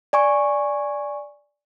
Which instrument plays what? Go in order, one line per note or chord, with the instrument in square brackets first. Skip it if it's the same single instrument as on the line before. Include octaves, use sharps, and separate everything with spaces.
[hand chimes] D5 G#5 C#6